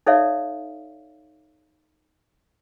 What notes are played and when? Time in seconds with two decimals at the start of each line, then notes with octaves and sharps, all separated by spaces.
0.07 D#4 A4 C#5 D5 E5 F5